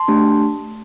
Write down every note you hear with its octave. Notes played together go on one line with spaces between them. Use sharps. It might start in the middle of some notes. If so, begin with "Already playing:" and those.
Already playing: A5 C6
A3 D4 G4